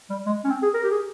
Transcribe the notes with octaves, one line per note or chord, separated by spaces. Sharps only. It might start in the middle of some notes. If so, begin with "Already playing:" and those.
G3
G#3
C#4
C4
G#4
A#4
G4
G#4